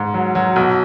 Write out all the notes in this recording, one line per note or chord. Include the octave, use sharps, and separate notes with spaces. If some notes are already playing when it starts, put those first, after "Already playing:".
Already playing: G#2
F#3
F#3
B1